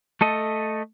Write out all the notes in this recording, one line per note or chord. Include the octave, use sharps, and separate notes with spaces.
A3 A4 D#5